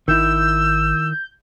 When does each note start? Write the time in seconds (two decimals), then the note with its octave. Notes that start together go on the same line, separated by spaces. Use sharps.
0.08 G#1 D#3 E4 E6 G6